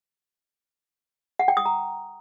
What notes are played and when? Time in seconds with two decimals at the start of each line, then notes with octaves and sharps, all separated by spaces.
1.39 F#5
1.48 G5
1.57 D#6
1.65 A#5